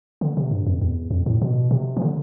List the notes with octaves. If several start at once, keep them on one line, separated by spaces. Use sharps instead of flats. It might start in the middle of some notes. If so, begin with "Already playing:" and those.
D3
C3
G2
F2
E2
F2
A2
B2
C3
E3
D3